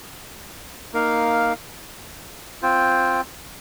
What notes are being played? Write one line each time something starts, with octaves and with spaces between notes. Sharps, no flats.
A#3 D#4 A#4 F5
C4 F4 C5 G5